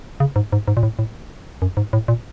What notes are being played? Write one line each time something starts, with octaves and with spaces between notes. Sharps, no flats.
C#3
G#2
G#2
G#2
A#2
A2
A2
F#2
G#2
A2
A#2